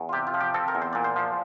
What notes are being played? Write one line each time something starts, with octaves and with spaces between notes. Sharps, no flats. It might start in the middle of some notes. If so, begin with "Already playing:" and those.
Already playing: E2
F4
C3 G4
F4
F3
G4
C4 A4
A#4
E2
C5
A#2 D5
C5
F3